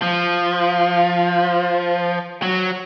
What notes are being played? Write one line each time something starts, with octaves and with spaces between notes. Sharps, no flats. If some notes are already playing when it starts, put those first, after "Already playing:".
F3
F#3